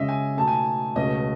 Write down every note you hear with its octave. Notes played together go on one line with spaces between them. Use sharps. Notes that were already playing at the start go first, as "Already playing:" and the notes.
Already playing: C#3 G#3 C#4 D#5 E5
G#5
B2 A3 D#4 A5
G#5
C#2 B2 A3 C#4 D#5